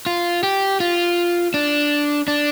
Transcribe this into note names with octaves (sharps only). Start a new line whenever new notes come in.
F4
G4
F4
D4
D4